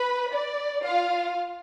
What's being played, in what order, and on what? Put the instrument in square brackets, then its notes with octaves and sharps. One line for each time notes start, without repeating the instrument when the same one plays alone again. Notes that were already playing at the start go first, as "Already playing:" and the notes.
Already playing: [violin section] B4 B5
D5
F4 F5